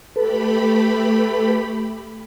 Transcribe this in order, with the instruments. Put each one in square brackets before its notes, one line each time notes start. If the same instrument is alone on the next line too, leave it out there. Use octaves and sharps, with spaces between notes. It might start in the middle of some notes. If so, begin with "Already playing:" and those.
[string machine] A3 G4 B5 [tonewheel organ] A4 B4